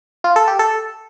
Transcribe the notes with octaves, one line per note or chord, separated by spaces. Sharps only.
F4
A4
G4
A4